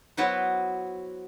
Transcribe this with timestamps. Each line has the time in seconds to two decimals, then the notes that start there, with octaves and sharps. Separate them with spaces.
0.17 F#3 B3 E4 F#4 B4 C5